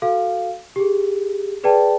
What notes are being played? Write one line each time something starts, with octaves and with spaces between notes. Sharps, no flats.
F#4 A4 F5
G4 G#4
G#4 B4 D5 G5 A5